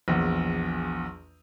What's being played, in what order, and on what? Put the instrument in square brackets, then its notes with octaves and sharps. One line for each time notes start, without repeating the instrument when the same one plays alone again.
[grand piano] A#1 E2